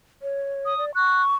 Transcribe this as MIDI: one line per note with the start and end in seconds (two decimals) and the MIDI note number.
0.22 0.77 73
0.65 0.85 87
0.78 0.95 74
0.95 1.36 85
0.95 1.22 90